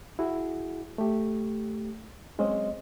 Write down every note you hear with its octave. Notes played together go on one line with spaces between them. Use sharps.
E4 F#4 G#4
A3 G4
F#3 G#3 C4 C#4 C5 D#5